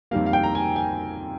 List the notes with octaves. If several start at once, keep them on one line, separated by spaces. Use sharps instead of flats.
F2 D#3 G3 A#3 F5
F5
G5
A#5
G#5
G#5